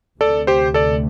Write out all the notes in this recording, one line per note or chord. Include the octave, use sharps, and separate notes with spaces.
D2 C3 A3 A4 D5
G4 C5
A4 D5